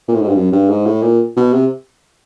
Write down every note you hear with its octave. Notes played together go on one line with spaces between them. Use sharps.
A#2
A2
G#2
G2
F#2
G2
G#2
A2
A#2
B2
C3